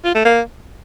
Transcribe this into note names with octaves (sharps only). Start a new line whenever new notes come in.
F4
A3
A#3